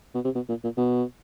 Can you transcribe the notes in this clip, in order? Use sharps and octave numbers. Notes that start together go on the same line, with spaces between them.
B2
C3
B2
A#2
A#2
B2